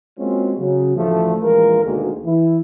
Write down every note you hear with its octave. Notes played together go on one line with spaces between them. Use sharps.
G#3 A#3 C4 C#4 F4 F#4
C#3 F#3
A1 D2 F3 A3
A#1 E3 G#3 F4 A#4
D2 B2 D3 D#3 G#3 A#3
E3 E4